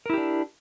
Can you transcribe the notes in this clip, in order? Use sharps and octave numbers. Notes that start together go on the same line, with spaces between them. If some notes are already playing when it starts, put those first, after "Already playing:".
D4 E4 G4 A#4